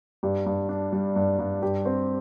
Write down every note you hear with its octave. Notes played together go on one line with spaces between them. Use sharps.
G2 G4
G2
D4
G3
G2
G2
G2 G4
C4